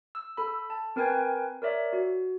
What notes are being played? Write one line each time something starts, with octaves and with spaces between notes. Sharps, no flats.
E6
A4 B5
A5
C4 A#4 B4 G5 G#5 G#6
A#4 C#5 D5 E5
F#4